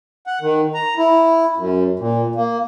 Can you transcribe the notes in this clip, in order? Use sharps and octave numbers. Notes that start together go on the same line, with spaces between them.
F#5
D#3
A#5
E4
F#2
A#2
A#3